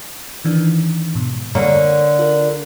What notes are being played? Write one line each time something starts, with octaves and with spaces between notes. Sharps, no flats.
D#3 E3 D4
G#2 B2
D3 A#3 C#5
F4 A#4